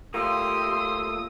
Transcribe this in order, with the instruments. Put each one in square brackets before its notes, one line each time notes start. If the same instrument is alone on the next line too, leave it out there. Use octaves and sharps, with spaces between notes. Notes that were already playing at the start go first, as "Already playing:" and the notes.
[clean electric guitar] A3 A#3 F4 [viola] G4 C6 [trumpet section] D#6 [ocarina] E6